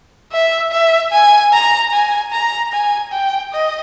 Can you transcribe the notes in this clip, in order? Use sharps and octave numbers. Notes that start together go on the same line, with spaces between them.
E5
E5
G#5
A#5
G#5
A#5
G#5
G5
D#5